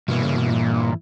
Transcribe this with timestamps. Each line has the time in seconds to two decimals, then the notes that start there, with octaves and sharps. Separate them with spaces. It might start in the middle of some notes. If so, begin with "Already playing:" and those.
0.08 G2 B2 E3 A#3 E4
0.23 C#3
0.36 B2
0.50 A#2